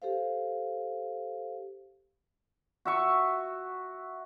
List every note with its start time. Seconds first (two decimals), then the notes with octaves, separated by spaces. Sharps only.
0.02 G4 A4 C5 F5
2.85 F#4 E5 C#6